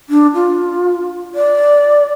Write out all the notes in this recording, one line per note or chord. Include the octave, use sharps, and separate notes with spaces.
D4
F4
D5